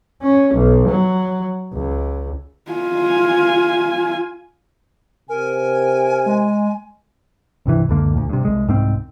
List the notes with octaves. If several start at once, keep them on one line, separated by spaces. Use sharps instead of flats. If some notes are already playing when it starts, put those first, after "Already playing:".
C#4
B1
F#3
C#2
F4 G#5
C3 A#4 G#5
G#3
C2 G2 C3 E3
C#2 F#2 D3 A#3
D2 A#2
G2 C3
C2 G#3
C2 G#2 G#3 C4